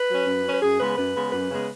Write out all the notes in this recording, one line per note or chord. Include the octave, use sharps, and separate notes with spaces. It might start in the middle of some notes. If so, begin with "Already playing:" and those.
Already playing: B4
F#3 C#4
F#2
F#3 C#4
B4
F#2 G#4
C#3 G#3 B3 B4
F#2 B4
C#3 G#3 B3
F#2 B4
C#3 G#3 B3